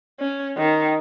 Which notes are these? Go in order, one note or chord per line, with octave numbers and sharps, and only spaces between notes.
C#4
D#3